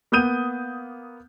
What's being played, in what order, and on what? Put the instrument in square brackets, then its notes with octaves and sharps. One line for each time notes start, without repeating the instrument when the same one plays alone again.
[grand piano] A#3 B3 D#6 G6 D#7